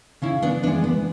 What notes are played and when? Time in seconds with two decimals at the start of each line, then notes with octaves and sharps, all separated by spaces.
0.22 C#3 C#4 E4
0.42 B3 D4
0.63 E3 G#3 B3 D4
0.84 B3